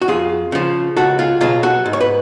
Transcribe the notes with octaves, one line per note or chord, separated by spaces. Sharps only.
F#4
F2 F4 G#4
C#3 F3
C#2 F#4 A4
F4 G#4
B2 F#3 F4 G#4
F#4 A4
G#2
C#5
B4